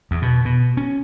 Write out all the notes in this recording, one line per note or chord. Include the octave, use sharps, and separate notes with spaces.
E2
B2
B2
C#4